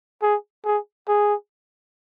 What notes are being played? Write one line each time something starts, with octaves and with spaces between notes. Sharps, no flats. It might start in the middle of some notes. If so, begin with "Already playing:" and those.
G#4
G#4
G#4